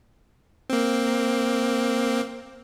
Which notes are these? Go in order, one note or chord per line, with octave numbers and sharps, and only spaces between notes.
A#3 C4